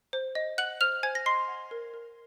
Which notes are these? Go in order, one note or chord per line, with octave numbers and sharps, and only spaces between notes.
C5
D#5
F#5 F#6 F#7
C5 F6 F7
C5 G#5 G#6
A#6
D#5 C6 C7
F#5
A#4
A#4